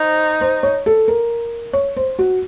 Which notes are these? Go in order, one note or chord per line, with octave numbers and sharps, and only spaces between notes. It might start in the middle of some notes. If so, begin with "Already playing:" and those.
Already playing: D#4 C5
C5
C#5
A4
A#4
C#5
C5
F#4